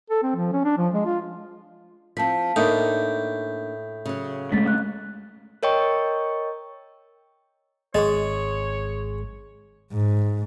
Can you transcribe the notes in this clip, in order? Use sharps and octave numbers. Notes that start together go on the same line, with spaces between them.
A4
C4
F3
C#4
D4
F3
G#3
F4
F3 C4 F5 A5 B6
A2 A#3 D4 D#4 E5 D#6 G6
C#3 F#3
G#3 A3 C#4 A6 B6
F#6
A#4 C#5 D#5 G5 C#6
G#1 G#3 G#4 C#5 D#5
G#2